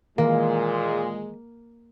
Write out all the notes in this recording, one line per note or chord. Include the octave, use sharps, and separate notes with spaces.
A#2 D#3 E3 G#3 A#3